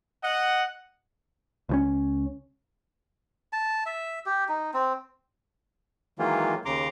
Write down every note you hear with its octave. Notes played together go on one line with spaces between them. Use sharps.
D#5 F#5
C#2 F3 C#4
A5
E5
G4
D#4
C4
D#3 E3 F#3 G#3 A#3 F4
D#2 C#3 A#5 C6 D6